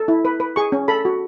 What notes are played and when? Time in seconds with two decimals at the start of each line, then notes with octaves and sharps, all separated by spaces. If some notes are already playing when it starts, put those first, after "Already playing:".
Already playing: A4
0.08 E4
0.25 B4
0.40 B4
0.56 G#4 C#6
0.72 C#4
0.88 A4 B5
1.05 F#4